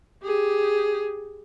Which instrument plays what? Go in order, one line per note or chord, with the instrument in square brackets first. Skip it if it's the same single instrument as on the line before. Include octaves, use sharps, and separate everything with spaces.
[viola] G4 G#4